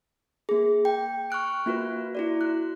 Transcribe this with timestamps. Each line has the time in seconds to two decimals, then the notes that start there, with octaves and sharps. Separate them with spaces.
0.49 A#3 G#4
0.85 G5
1.30 C#6 F6 F#6 D7
1.66 A#3 F4 F#4 B4
2.15 E4 F#4 D5
2.41 F#6